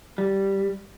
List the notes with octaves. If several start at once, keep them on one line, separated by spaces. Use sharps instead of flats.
G3